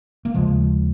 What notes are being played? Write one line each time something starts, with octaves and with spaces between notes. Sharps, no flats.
A#3
D#2 C#3 F3 G#3